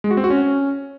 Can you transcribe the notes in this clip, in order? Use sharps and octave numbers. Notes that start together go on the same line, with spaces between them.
G#3
F#4
C4
F#4
C#4